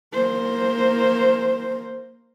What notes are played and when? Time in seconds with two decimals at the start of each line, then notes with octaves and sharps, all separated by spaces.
0.13 A#3 C5